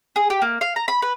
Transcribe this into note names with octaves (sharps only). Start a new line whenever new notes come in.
G#4
G4
A#3
F5
A#5
B5
B4